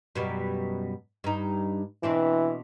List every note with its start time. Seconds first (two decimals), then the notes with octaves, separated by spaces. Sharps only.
0.15 F#2 B2 G3
1.24 G2 D#4
2.03 B2 E3 C4 D4